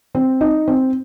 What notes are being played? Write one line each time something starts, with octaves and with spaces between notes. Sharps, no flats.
C4
D#4
C4